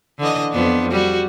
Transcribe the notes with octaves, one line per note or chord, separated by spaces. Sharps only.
D3 E3 D#5
F2 B3 D4
G3 F#4